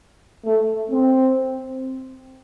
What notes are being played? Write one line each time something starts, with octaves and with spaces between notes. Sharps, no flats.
A3
C4